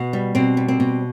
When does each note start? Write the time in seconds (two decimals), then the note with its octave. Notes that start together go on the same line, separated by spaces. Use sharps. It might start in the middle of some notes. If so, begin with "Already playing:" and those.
Already playing: B2 B3
0.13 G3
0.35 B2 C4
0.57 G3
0.68 C4
0.80 B2